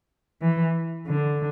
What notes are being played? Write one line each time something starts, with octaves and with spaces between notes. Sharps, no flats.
E3
D3